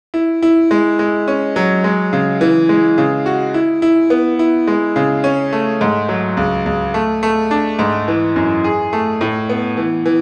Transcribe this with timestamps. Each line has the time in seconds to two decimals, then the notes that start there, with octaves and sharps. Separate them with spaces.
0.14 E4
0.42 E4
0.71 G#3
0.99 G#3
1.28 C#4
1.56 F#3
1.84 G#3
2.13 C#3
2.41 E3
2.69 G#3
2.98 C#3
3.26 F#4
3.54 E4
3.82 E4
4.10 B3
4.39 E4
4.67 G#3
4.96 C#3
5.24 C#4
5.53 A3
5.81 G#2
6.09 F#3
6.37 C#2
6.66 C#2
6.94 A3
7.23 A3
7.51 D4
7.79 G#2
8.08 E3
8.36 F#2
8.64 G#4
8.93 A3
9.21 A2
9.49 B3
9.77 E3
10.06 E3